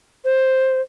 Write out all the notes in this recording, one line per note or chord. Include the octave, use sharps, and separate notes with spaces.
C5